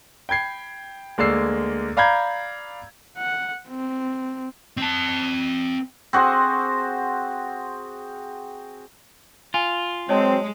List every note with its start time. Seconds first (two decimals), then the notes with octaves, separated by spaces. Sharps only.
0.29 G5 B5 G#6 C7
1.18 D2 G#3 A#3 D5 E6 C7
1.97 D5 F5 A#5 B5 G6 G#6
3.17 F#5
3.68 C4
4.78 C4 A5
6.13 C4 F#4 G#4 C5
9.54 F4 G#5
10.09 F#3 G#3 C4 C#5 D#5 A5